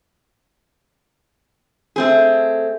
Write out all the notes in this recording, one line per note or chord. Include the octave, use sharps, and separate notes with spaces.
A3 C4 G#4